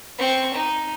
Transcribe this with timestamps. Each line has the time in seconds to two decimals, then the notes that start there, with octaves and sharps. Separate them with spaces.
0.19 C4 C#6
0.54 D#4